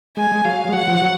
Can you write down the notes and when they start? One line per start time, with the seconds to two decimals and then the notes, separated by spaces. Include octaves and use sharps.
0.17 G#3 G#5
0.32 G#3
0.45 F#3 F5
0.68 G#3
0.73 F#3 F#5
0.88 F3
1.02 F#3